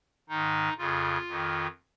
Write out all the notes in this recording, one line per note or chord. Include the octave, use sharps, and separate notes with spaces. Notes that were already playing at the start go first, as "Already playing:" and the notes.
G#2 D#3 D#4
F2 C#3 F4
F2 D#3